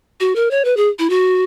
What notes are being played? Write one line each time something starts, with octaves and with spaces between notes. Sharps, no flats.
F#4
A#4
C#5
B4
G#4
E4
F#4